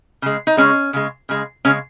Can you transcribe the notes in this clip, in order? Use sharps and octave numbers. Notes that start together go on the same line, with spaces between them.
C#3 G#3
D#4
C#3 G#3 C#4
C#3 G#3
C#3 G#3
C#3 G#3 C#4